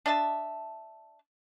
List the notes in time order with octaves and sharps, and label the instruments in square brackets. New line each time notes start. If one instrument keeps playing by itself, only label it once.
[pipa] D4 D#5 E5 A5